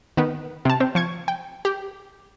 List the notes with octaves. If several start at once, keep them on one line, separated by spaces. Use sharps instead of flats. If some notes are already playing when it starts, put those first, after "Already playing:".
D#3 B3
C3 A5
C4 C5
F3 C#6 G#6
G5
G4